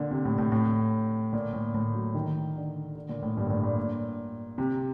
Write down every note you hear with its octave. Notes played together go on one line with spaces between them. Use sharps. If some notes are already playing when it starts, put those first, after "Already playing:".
Already playing: A#2 D3
C3
A2
A2
A2
A#2
A2
A2
F#3
D#3
D3
D3
A#2
A2
G2
A#2
A2
A#2
C3